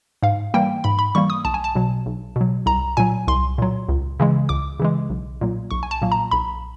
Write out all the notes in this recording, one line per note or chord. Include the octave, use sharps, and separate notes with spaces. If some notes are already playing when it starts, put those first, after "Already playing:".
G#2 F5
E3 G3 A#3 G5
G#2 B5
B5
E3 G3 A#3 C#6
D#6
B1 A5
G#5
A5
B2 F#3
B1
B2 F#3
C2 A#5
A#2 F#3 G#5
C2 C6
A#2 F#3
C#2
C#3 E3 G#3
C#2 D6
C#3 E3 G#3
B1
A#2 F#3 A#3
B1 C#6
G#5
A5
A#2 F#3 A#3
A#5
B1 B5